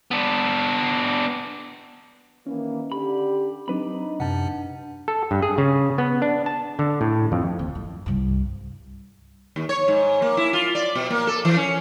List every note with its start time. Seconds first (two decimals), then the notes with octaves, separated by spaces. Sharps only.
0.11 B3 D4
2.47 D#3 E3 A#3 C#4
2.92 D3 G4 B5
3.68 F#3 C4 D4 D#4 B4 B5
4.20 F#2 C3 F#5 A5
5.08 A4
5.31 G2
5.42 G#4
5.58 C#3
5.98 B3
6.22 D4
6.46 A5
6.79 D3
7.01 A2
7.32 F2
7.59 D#2
7.75 F#2
8.06 C2 G2
9.56 D#2
9.69 C#5
9.88 G#2
10.22 A#3
10.37 E4
10.53 F4
10.75 D5
10.95 B2
11.10 A#3
11.27 A4
11.45 E3
11.56 C#4